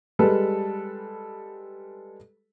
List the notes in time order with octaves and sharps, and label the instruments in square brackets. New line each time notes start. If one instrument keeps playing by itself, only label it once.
[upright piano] G3 G#3 A4 B4